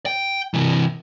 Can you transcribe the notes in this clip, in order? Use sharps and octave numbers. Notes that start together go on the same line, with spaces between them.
G5
C3 E3